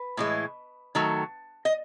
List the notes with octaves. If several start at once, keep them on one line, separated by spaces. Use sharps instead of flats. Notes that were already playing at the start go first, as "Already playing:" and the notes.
Already playing: B4
A2 E3 G#3
D#3 F#3 A3
D#5